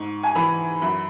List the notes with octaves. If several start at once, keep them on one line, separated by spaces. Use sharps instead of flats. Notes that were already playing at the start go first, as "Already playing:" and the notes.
Already playing: G#2 C#6
G#5
E3 B5
F#2 B5